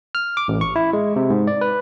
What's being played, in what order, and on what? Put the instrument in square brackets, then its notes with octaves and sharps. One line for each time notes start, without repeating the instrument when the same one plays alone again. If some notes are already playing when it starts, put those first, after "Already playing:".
[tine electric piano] F6
D6
A1
C#6
E4
G#3
C3
G#2
D5
B4